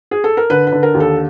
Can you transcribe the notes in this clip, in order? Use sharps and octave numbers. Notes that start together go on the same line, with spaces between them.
G#4
A4
A#4
D3 B4
B4
D3
A#4
D#2
A4